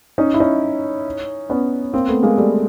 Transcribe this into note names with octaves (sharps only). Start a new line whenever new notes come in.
C#4 D#4
E4
C#4 D#4
B3 C#4
A#3 C4
A3 B3
G#3 A#3
G3 A3